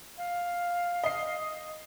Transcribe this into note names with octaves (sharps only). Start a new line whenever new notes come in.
F5
D#5 C7